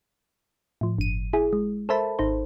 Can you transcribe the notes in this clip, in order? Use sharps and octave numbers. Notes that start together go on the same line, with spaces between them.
A2 F3
G1 D#7
E4 G#4
G#3
A4 A#4 C5 E5 A5 B5
G#1 D#4 C5